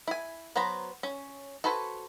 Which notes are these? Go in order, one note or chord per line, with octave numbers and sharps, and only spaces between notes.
E4 G#5
F#3 B3 C5 A#5 B5
C#4
F#4 A4 B4 C5 G#5